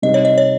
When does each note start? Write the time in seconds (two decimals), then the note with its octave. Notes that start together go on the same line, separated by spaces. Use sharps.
0.02 C3 G3 C4 D#4 D#5
0.14 C#5
0.25 D#5
0.38 C#5